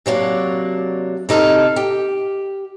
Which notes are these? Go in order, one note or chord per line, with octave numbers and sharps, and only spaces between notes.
C3 F#3 A#3 D4
C3 D#4 A4 A#4 F5
G4